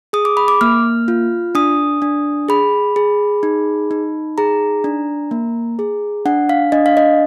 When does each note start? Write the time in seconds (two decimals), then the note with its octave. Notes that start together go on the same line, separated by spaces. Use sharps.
0.13 G#4 D#6
0.25 D6
0.37 B5
0.48 D6
0.61 A#3 F6
1.08 F4
1.55 D4 D#6
2.02 D4
2.49 G#4 B5
2.96 G#4
3.43 D#4
3.91 D#4
4.38 G#4 A#5
4.84 D4
5.31 A#3
5.79 G#4
6.26 D4 F#5
6.49 F5
6.72 D4 D#5
6.86 F5
6.97 D#5